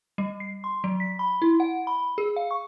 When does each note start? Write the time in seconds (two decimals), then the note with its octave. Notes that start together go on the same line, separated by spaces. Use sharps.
0.18 G3
0.40 C7
0.64 C6
0.84 F#3
1.00 B6
1.19 B5
1.42 E4
1.60 F#5
1.87 B5
2.18 G#4
2.36 F5
2.51 C#6